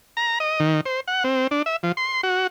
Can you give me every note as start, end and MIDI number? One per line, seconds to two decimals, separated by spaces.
0.17 0.39 82
0.40 0.60 75
0.60 0.81 51
0.86 1.00 72
1.08 1.24 78
1.24 1.47 60
1.51 1.62 62
1.66 1.76 76
1.83 1.92 53
1.97 2.21 84
2.23 2.47 66